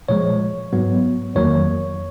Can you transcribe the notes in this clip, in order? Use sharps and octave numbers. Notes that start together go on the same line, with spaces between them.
A#2 F3 G#3 C#5
G#2 F#3 B3
F2 D#3 F#3 A#3 C#5